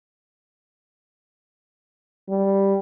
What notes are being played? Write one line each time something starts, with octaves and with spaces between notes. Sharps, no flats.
G3